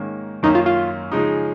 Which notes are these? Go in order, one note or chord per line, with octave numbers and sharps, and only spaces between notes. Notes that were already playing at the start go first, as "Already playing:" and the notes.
Already playing: G#2 D#3 A#3 C#4
F#2 D#3 A#3 C#4 D#4
F4
F4
C#3 F3 G#3 D#4